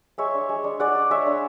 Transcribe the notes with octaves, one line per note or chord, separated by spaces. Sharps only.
G#3 C#5 E5
D4
G#3
D4
G#3 D5 F#5
D4
G#3 C#5 E5
D4